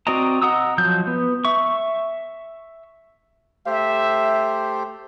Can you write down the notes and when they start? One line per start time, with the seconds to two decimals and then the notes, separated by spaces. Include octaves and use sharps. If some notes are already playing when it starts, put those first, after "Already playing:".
0.07 C4 F#4 D5 D#5 A#5
0.42 D#5 F#5 A#5 D#6 E6
0.78 F3 F#3 G6
1.07 B3
1.45 E5 C#6
3.66 A3 G4 C5 E5